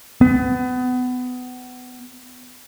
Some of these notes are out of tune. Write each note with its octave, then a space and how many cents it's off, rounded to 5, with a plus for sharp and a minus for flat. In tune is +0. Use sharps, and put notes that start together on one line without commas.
B3 +25